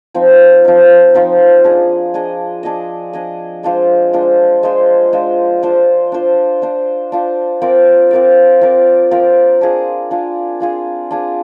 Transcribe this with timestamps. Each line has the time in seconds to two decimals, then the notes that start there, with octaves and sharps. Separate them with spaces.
0.14 F3 C4 D#4
0.65 F3 C4 D#4
1.14 F3 C4 D#4
1.64 D4 G#4 D#5
2.14 D4 G#4 D#5
2.63 D4 G#4 D#5
3.13 D4 G#4 D#5
3.63 G#3 D4 F4 C5
4.13 G#3 D4 F4 C5
4.63 G#3 D4 F4 C5
5.13 G#3 D4 F4 C5
5.63 D4 F4 C5
6.12 D4 F4 C5
6.62 D4 F4 C5
7.12 D4 F4 C5
7.62 C4 F4 A#4 D5
8.11 C4 F4 A#4 D5
8.61 C4 F4 A#4 D5
9.11 C4 F4 A#4 D5
9.61 D4 F4 G#4
10.11 D4 F4 G#4
10.60 D4 F4 G#4
11.11 D4 F4 G#4